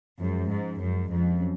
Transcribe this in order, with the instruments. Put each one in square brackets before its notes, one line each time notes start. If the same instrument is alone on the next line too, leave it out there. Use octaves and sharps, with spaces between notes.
[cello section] F#2 [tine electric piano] F3 G#3 C#4 G#4
[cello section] G#2
F#2
F2
[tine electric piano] F#3 C#4